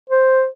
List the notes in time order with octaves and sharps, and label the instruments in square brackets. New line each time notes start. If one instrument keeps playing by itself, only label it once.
[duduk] C5